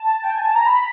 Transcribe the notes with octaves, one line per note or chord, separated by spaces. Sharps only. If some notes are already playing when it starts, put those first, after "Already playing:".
Already playing: A5
G5
G#5
A5
A#5
B5